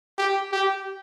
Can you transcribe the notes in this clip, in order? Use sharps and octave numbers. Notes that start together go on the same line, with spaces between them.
G4
G4